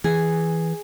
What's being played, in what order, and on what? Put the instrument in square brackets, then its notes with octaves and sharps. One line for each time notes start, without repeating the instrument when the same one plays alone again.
[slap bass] E3 [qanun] G#4